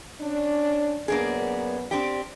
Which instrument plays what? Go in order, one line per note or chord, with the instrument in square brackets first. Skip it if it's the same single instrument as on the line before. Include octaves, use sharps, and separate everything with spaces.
[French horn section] C#4 D4
[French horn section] F#2 B3 [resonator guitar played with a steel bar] A#3 D4 G#4
[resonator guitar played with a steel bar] C4 D4 G4